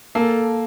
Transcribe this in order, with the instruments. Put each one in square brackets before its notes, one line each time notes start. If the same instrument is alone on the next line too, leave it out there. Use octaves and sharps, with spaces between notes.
[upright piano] A#3 [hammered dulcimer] A4